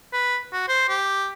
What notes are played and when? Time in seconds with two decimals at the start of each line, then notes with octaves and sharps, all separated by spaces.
0.13 B4
0.52 F#4
0.68 C5
0.89 G4